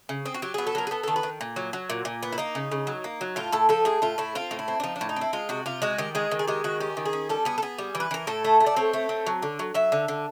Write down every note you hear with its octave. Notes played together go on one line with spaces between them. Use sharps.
C#3
C4 G#4
F#4
F#3 G4
B3 G#4
A4
F#3 A#4
G#4
B3 A4
D#3 A4
B4
D#3
A#2
F#3
F#3
A#2
A#2
B3
E4
A#3 D#4
C#3
C#3
F#3
A#3
F#3
A2 F4
A2 A4
F3 A4
A2 G#4
A2 F4
A2 E4
C4 F4
A2
E4
C4
D4
F3 D#4
D4
A2
D#4
C4 E4
G#3 F4
C3 F#4
C3 F4
G#3 F#4
D#3 G4
G#3 G#4
D#3
G#4
G#3 G4
D#3 F#4
C#4 G4
D#3
G#4
C#4
G3 A4
B3 G#4
A4
B3 G#4
G3
E3
B4
E3 A#4
A2 A4
A3
A3
D5
C4 C#5
A3
C4
F#3
D3
F#3
F#3 E5
D3
D3